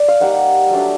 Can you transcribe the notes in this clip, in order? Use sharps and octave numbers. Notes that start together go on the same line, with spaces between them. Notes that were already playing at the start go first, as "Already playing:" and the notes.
Already playing: D5
F5
G3 A#3 D#4 F#5
F#3 A3 D4